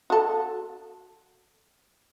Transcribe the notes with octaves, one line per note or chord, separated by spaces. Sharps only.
F#4 A4